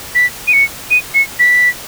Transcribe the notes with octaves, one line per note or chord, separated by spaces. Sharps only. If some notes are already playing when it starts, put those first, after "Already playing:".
B6
D#7
C#7
D#7
C#7
B6